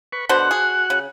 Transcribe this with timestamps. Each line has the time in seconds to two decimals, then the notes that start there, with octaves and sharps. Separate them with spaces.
0.12 B4 C#6
0.29 B2 D3 F#4 C5 F#5
0.51 G#4
0.90 C#3